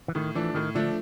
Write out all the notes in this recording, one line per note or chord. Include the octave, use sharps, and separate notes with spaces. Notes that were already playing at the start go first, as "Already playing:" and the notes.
E3
A2 D#3
E3 F3 A3 D4
A2 D#3
D3 F3 A3 D4